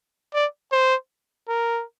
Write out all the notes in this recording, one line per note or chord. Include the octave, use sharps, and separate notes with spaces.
D5
C5
A#4